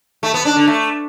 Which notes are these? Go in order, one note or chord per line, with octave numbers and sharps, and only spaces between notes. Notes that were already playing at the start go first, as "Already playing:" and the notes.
A3
B3
D4
D3
A3